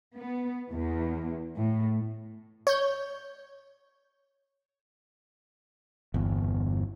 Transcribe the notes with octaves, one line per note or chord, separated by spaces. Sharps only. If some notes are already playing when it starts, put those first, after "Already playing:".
B3
E2
A2
C#5 G6
G1 E2